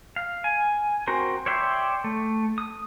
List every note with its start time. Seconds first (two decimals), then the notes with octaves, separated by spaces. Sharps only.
0.16 F5
0.44 G#5
1.07 C4 F#4 A#4 C5
1.46 C#5 D5 E5 G5 C6
2.04 A3
2.58 D#6